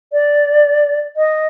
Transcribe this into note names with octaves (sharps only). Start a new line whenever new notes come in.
D5
D#5